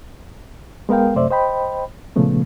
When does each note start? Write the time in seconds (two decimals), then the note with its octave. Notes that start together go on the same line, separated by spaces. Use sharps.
0.89 G#3 B3 A#4 F5 G5
1.15 F#2 C3 A3 C5 D5 E5
1.30 C5 D#5 G5 B5
2.16 A#2 C#3 F3 A3 B3